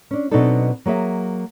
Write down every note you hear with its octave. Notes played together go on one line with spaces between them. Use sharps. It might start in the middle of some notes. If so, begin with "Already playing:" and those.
C#4 D4
B2 F#3 C4 D4 D#4 A4
F#3 A#3 G#4 E5